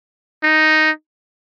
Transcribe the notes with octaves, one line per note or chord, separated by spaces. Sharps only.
D#4